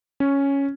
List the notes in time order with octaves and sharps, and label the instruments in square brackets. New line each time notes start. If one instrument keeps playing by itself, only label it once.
[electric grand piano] C#4